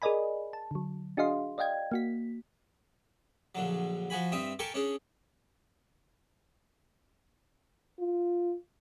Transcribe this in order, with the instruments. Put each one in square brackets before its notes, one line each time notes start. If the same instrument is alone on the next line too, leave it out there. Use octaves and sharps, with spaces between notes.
[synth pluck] G#4 A#4 D5 D#5 G#5 B5
A5
D3 F#3
D4 F#4 G#4 D#5 F5 C6
D5 D#5 F5 G5 G#6
A#3 F#4 B6
[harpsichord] A#1 D3 F#3
F3 F#4 G#5 B5
G2 C4 E5 D#6
G4 A4 A#4 G#5 C#6
C#4 D4 G#4
[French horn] F4